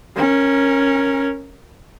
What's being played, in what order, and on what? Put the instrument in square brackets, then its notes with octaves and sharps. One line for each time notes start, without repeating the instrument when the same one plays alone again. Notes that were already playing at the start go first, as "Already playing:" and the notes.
[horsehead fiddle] C#4 A#4